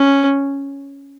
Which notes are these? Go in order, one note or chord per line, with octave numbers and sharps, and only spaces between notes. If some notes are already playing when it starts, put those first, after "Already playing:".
Already playing: C#4